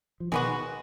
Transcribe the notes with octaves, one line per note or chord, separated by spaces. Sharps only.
F3
B2 D#3 G#3 B3 F#4